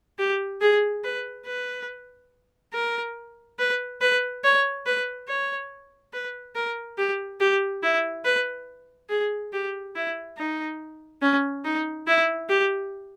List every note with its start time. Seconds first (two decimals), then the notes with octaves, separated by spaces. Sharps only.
0.19 G4
0.61 G#4
1.04 B4
1.46 B4
2.74 A#4
3.59 B4
4.01 B4
4.44 C#5
4.86 B4
5.28 C#5
6.13 B4
6.55 A#4
6.98 G4
7.40 G4
7.83 E4
8.25 B4
9.09 G#4
9.53 G4
9.95 E4
10.37 D#4
11.22 C#4
11.64 D#4
12.07 E4
12.49 G4